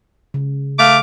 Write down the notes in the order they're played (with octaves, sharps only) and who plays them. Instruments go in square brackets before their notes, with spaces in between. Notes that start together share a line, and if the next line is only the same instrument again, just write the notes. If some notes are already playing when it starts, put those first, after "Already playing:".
[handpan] C#3
[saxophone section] A3 F5 [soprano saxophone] D6